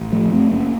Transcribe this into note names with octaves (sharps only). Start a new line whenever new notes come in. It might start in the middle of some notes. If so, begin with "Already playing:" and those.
Already playing: A1
A2 F3 A3
F#2 A3 C4
F#1 A#3 C#4